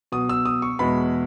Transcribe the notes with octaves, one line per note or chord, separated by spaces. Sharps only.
B2 F#3 D#6
E6
D#6
C#6
E2 B2 G#3 B5